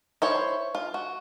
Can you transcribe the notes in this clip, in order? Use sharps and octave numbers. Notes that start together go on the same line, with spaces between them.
E4 C5 C#5
F4
F#4